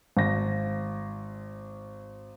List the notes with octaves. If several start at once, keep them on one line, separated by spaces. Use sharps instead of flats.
G#1 A#6